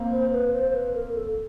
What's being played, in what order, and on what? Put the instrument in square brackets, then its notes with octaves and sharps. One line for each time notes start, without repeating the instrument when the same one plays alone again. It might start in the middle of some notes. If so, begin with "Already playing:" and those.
Already playing: [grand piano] A#3 C4
[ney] C5
B4
C5
B4
A#4
A4